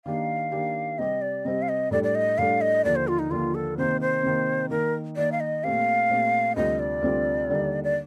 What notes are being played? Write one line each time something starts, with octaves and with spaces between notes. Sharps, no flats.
D#3 A#3 D4 G4 F5
D#3 A#3 D4 G4
C3 G3 C4 G4 D#5
D5
C3 G3 C4 G4 D#5
F5
D#5
A2 G3 D4 A4 D5
D5
D#5
A2 G3 D4 A4 F5
D#5
D#2 D3 F3 D5
C5
F4
D#4
D#2 D3 F3 F4
A4
C3 D#3 A#3 C5
C5
C3 D#3 A#3
D#3 A#3 D#4 A#4
D#3 A#3 D#4 D5
F5
D#5
A#2 A3 C4 G4 F5
A#2 A3 C4 G4
D2 C3 G3 C4 F4 D#5
D5
D2 C3 G3 C4 F4
D#2 D3 G3 A#3 D#4
D5